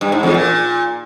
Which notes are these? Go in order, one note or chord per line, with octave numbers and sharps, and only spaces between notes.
G2
G#2
E2
A#2